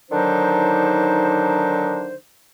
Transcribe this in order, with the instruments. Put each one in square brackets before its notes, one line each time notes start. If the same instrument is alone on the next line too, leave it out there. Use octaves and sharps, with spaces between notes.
[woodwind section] D3 D#3 F#3 D4 D#4 C5